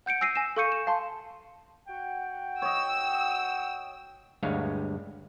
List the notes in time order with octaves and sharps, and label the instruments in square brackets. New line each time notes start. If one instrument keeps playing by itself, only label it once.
[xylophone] F#5 G6 C#7 D7
G#5 E6 A#6 C7 D7 D#7
G#5 A#6 E7
A4 F5 C#6 G6 C#7 D#7
E7
F5 A5 C6
[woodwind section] F#4 F#5 G5
[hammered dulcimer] C#5 D#5 [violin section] E6
[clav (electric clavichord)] D2 G2 G#3 C#5 F5